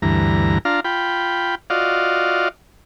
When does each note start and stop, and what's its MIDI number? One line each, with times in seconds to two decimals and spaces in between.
0.02 0.58 38
0.02 0.58 43
0.02 0.58 52
0.02 0.58 82
0.65 0.80 62
0.65 0.80 65
0.65 0.80 77
0.65 0.80 82
0.84 1.55 65
0.84 1.55 79
0.84 1.55 83
1.70 2.48 65
1.70 2.48 66
1.70 2.48 74
1.70 2.48 75
1.70 2.48 77